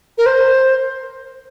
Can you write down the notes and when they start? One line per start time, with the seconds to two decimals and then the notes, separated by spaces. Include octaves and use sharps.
0.18 A#4
0.26 C5